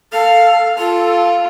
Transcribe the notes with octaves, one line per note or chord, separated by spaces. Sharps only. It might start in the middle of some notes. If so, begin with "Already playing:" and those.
A4 F5
F4 A4